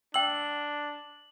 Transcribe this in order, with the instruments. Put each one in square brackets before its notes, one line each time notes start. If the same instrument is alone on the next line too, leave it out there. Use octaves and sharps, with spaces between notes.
[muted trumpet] D4 [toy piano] G5 E6 [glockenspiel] F#7